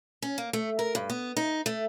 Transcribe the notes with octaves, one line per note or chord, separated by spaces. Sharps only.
C#4
A#3
A3
A#4
G2
B3
D#4
A3